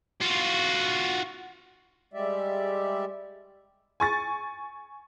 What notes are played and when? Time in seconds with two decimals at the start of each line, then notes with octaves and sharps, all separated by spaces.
0.21 F4 F#4
2.13 G3 G#3 G4 D5 E5
4.00 G#5 C#6 A6